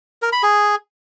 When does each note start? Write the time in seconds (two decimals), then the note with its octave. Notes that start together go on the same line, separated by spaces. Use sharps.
0.22 A#4
0.32 B5
0.43 G#4